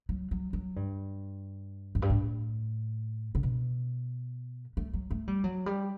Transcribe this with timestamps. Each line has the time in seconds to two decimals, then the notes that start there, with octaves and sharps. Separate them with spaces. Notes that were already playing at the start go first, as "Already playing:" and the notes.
0.09 F#3
0.31 F#3
0.53 F#3
0.76 G2
1.95 F#2
2.02 G2
2.10 A2
3.35 C#3
3.43 B2
4.77 A3
4.94 F#3
5.11 A3
5.28 G3
5.44 F#3
5.66 G3